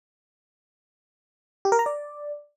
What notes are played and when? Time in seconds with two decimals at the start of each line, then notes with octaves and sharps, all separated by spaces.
1.65 G4
1.72 A#4
1.79 A#5
1.86 D5